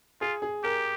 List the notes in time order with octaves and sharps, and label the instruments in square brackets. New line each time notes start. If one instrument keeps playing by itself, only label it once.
[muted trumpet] F4 [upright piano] G#4
[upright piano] G#4
[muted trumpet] G4 [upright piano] A#4